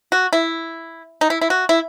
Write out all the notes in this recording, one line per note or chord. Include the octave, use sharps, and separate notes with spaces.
F#4
E4
D#4
E4
E4
F#4
E4